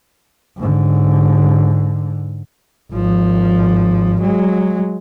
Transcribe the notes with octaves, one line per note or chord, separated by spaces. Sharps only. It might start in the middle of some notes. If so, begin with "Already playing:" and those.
G#2 D3
G#1 F3
F#3 G#3